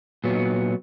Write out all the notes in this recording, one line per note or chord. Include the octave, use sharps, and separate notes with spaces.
A#2 F#3 B3